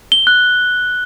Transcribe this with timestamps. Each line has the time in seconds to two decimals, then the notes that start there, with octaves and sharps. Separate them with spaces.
0.12 G7
0.27 F#6